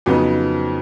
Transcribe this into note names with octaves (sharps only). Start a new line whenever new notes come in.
F2 C#3 F#3 B3 D#4